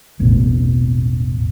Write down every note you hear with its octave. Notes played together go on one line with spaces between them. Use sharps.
E1 A1 B2